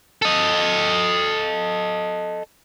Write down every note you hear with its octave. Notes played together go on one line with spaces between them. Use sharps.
A4 D#5